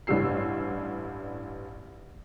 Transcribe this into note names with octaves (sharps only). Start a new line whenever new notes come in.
A1 G2 G3 E6 C7